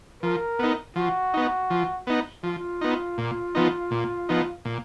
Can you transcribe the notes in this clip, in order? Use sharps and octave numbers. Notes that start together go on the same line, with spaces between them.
F3 A#4
B3 D#4
F3 F#4
B3 D#4
F3
B3 D#4
F3 F4
B3 D#4
A#2
F3 B3 D#4
A#2
F3 B3 D#4
A#2